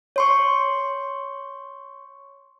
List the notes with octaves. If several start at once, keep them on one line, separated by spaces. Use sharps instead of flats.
C#5 C6 C#6